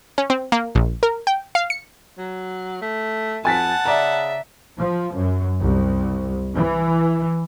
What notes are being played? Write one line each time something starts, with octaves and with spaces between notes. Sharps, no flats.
C#4
C4
A#3
A#1
A#4
G5
F5
C#7
F#3
A3
F2 F#5 G#5 A5 A6 B6
C#3 D5 E5 A#5
F3
F#2
C2
E3